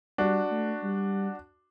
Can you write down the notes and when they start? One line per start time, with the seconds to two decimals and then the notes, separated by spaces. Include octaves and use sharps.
0.18 G3 D4 F#4
0.51 A3
0.83 G3